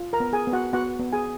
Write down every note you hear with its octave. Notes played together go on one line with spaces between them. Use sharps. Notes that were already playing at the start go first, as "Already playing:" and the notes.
Already playing: F4
A#4 A#5
B3
G#4 G#5
B3
F#4 F#5
B3 F#4 F#5
B3
G#4 G#5